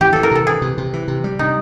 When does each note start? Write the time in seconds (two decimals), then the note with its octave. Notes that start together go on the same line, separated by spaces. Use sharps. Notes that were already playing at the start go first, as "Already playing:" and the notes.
0.01 E3 G4
0.13 E3 A4
0.23 A#4
0.31 C3 A4
0.47 E3 G#4
0.62 C3
0.78 C3
0.93 E3
1.08 C3
1.24 G3
1.39 C3 D#4